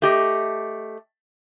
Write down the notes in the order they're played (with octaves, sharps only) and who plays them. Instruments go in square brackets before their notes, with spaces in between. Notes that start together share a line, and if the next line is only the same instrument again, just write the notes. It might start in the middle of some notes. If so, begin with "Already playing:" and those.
[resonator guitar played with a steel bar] A3 G4 D#5